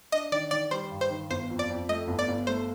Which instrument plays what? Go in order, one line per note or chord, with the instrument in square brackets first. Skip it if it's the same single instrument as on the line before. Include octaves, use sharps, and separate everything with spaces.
[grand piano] D4 [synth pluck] D#5
[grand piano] D#3 [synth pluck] D5
[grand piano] D#3 [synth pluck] D5
[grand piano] G3 [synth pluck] C5
[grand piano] G2
[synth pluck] C5
[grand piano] D#3
[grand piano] G1 [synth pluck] C5
[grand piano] F2
[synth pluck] D5
[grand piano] F2
[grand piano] A3 [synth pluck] D#5
[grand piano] G1
[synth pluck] D5
[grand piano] G1
[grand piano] A3 [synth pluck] C5